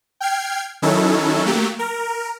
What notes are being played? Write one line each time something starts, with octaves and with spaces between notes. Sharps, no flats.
G5 F6 G#6 C7
D#3 F#3 C#4 D#4 E4 A4
F#3 A3 A#3 G4
A#4